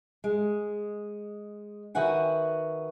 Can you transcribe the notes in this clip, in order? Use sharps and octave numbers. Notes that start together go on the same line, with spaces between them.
G#3
D#3 F#4 B4 E5 F#5 G#5